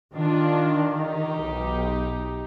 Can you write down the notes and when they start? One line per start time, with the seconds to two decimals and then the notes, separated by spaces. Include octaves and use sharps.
0.15 D#3 D4 F4
0.92 D#4 G4
1.42 B1